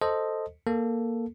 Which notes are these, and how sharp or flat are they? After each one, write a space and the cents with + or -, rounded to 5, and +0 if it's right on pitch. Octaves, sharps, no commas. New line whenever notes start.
A4 +5 C5 +0 D#5 +0
A#3 +0 A4 +0